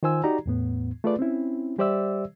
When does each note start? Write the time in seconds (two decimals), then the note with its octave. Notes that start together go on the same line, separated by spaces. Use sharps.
0.03 D#3 F4 C5 G#5 E6
0.24 D#4 F#4 G4 D5 A#5
0.46 E2 A2 B3
1.04 A3 F4 G#4 B4 D5
1.19 C4 C#4 E4
1.78 G3 G4 C5 D5 E5 E6